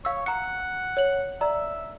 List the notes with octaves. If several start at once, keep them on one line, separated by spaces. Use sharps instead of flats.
C#5 F5 E6
F#5 A#5 C#7
C#5 F#7
D5 E5 A#5